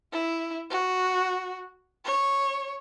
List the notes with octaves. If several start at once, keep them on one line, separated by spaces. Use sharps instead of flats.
E4
F#4
C#5